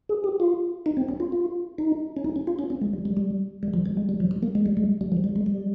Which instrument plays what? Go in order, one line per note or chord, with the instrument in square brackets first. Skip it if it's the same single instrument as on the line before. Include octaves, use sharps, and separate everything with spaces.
[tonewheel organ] G#4
G4
F4
D#4
C4
C#4
F4
F4
D#4
C#4
D#4
C#4
F4
C#4
C4
G#3
G3
G3
G3
G3
F3
G3
G#3
G3
F3
G3
A#3
G#3
G3
G#3
G3
F3
G3
G#3
G3